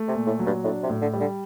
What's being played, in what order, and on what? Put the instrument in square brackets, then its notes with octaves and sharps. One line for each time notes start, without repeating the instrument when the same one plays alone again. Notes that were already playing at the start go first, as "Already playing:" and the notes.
Already playing: [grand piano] A3
[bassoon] C3
[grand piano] A#2
[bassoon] A2
[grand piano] F#3
[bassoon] G2
[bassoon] A2 [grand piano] D4
[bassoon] C3
[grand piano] A2
[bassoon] D3
[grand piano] G3
[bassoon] D3